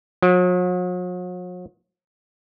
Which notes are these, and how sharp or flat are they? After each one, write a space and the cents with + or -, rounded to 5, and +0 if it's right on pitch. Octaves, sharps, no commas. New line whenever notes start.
F#3 -45